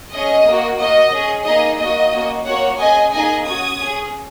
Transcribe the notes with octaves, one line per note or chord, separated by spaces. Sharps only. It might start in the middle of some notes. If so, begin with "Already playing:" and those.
C#4 G#4 D#5
A#3 F#4
A#3 F#4 D#5
C#4 G#4
A#3 D#4 G#4 D#5
A#3 F#4 D#5
A#3 C#4 F#4
A#3 C#4 F#4 C#5 F#5
C#4 G#4 D#5 G#5
A#3 D#4 G#4 D#5 G#5
C#4 F#4 D#6 G#6
C#4 G#4